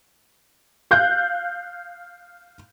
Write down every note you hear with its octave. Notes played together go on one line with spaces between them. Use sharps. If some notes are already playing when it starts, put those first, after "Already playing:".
F5 F#6 G6